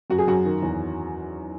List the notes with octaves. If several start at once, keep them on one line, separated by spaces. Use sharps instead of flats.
F#2 F#4
G#4
F#2 F#4
D#3
E2